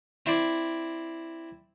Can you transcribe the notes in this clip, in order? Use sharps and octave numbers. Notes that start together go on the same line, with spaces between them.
C4 E4 C5 D5